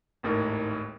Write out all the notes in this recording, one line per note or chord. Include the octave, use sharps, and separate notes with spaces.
G#1 D#2 A2 D#4 A#4